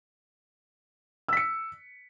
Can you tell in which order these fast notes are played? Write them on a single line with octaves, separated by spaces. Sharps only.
E6 B6 C#7